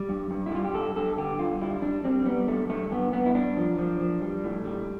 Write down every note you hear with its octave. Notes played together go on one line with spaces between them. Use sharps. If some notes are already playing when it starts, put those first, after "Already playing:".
Already playing: G3
G2
G2
E4
G3 F4
G4
G2 A4
G2 A4
D3 G4
G2 F4
G3 E4
G3 D4
G3 C4
G3 B3
G2 A3
G2 A3
G2 B3
G2 B3
E4
G2 D4
F3
F3
F3
G3
A2
G3